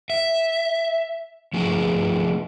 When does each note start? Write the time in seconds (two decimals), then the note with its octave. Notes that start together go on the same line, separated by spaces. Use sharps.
0.10 E5
1.53 F3 A3 D4 G#4